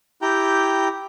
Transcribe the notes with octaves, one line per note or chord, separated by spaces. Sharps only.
E4 G4 G5 A#5 G6